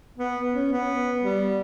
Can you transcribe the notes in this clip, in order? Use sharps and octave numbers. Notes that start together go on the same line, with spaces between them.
B3
C#4
B3
G3